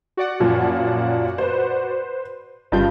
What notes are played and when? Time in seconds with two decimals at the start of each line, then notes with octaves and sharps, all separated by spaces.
0.17 F#4 D5 F#5
0.40 F#2 A#2 F3
1.38 B4 C5
2.72 G1 G2 C#3 G3 F4 G6